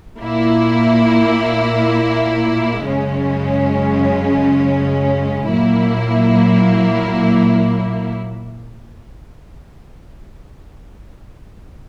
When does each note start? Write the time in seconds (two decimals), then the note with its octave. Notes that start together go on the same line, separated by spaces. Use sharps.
0.20 A#2 A#3 E4
2.84 F#2 C#3 G#3 C#4
5.47 A#2 F#3 A#3 E4